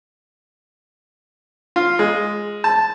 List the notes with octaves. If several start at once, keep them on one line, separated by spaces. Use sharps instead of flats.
F4
G#3
A5